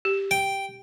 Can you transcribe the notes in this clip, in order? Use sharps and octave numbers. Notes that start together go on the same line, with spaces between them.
G4
G5